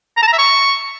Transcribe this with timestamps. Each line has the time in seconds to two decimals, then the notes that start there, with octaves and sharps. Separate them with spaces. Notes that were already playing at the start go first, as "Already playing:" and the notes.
0.17 A#5
0.22 A5
0.27 A#5
0.33 E5
0.38 C#6